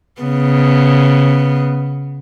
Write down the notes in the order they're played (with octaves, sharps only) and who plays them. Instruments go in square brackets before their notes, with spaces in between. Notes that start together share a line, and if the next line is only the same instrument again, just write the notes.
[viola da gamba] C#3 B3